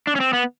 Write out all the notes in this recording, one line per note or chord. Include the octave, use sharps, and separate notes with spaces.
D4
C#4
C4
B3